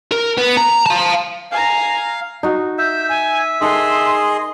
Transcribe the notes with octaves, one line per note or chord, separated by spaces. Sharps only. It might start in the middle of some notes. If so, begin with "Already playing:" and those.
A#4
B3
A#5
F5 A5
F5 G#5 A#5
D#4 F#4
E5 G6
G#5
D#3 G#4 A4 D#5 F#5 C6